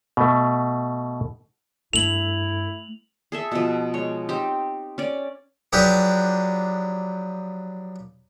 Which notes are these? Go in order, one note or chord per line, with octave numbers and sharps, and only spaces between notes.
B2 A3
G2 A3 E4 A4 F7 F#7
G#4 A4 E5
B2 F3
G#3 C#5
C4 D#4 G4
C#4 D5
F3 F#3 D4 G4 G#4 B4